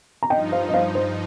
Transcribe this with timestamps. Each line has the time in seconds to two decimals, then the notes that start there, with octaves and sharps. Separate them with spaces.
0.23 A#5
0.30 G2 F3 D#4 D#5 G5
0.52 C5 F5
0.69 D#5
0.73 C5 F5
0.95 C5